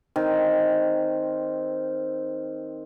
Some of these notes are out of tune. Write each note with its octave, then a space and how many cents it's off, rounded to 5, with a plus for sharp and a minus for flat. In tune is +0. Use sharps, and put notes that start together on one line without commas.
D#3 +0 C4 +0